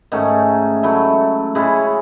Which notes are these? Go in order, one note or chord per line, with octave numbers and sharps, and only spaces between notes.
G#2 D#3 A3 C#4
F#3 A3 E4
C#3 G#3 C#4 E4